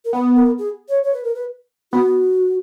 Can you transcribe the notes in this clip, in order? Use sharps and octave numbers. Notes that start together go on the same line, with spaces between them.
A#4
B3 B4
A#4
G#4
C#5
C#5
B4
A#4
B4
B3 F#4